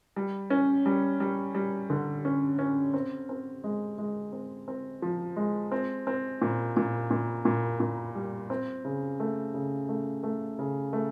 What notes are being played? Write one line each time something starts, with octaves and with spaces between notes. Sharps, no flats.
G3
C#4
G3
G3
G3
D3
C#4
C#4
C4
C4
G#3
G#3
C4
C4
F3
G#3
C4
C4
A#2
A#2
A#2
A#2
A#2
G3
C4
C#3
A3
C#3
A3
A3
C#3
A3